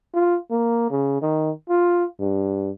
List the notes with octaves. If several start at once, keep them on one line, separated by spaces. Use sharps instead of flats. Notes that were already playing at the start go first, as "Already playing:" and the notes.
F4
A#3
C#3
D#3
F4
G2